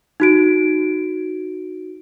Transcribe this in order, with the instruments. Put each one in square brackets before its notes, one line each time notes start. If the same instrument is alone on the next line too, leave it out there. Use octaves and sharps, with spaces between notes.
[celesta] D#4 F#4 D7